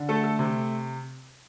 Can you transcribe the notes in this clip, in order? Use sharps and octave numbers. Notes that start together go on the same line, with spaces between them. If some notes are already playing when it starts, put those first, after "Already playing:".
Already playing: D3
A3 A4
A4
C3